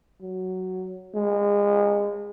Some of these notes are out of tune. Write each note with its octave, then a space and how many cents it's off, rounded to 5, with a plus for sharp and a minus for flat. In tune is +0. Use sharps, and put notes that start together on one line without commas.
F#3 +5
G#3 -30